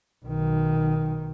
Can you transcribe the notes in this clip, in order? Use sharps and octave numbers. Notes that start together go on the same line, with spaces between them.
B1 D#3